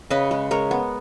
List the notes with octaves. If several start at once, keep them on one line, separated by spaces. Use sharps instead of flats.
C#3 B4 D#5
G#3
G#3 A#4 C#5
B3